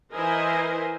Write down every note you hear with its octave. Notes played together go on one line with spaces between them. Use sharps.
E3 E4 A#4 C5 D#5 G#5